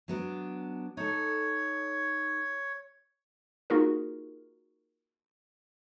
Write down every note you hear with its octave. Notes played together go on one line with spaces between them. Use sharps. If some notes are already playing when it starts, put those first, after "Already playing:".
F#3 B3 D4
D#4 A4 C#5
A#3 D#4 F4 F#4 G#4 A#4